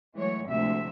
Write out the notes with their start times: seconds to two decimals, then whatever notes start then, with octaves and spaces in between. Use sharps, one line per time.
0.16 E3 F#3 G#3 A3 C#5
0.47 D2 A2 C3 F3 G#3 E5